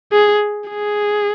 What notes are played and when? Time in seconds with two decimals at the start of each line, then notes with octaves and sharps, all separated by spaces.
0.12 G#4
0.69 G#4